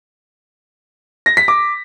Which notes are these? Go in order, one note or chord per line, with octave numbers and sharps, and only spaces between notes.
A#6
B6
D6